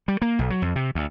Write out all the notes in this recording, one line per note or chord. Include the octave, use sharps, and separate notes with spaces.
G3
A#3
B1
F#3
F2
C3
D2